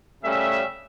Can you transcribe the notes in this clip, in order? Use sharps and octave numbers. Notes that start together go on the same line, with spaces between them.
C#3 G3 A3 C#4 E5